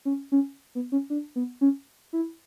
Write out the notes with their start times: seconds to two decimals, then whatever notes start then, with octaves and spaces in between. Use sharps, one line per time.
0.05 C#4
0.32 C#4
0.75 B3
0.92 C#4
1.10 D4
1.36 B3
1.61 C#4
2.13 E4